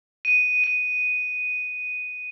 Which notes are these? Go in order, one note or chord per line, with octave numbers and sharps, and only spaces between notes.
D#7
D#7